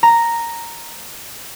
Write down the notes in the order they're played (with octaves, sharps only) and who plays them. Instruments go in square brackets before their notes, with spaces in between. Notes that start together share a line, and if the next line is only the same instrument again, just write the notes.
[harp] A#5